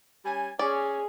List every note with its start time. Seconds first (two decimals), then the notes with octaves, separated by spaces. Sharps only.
0.25 G3 C#4 G#5
0.59 C#4 G#4 D5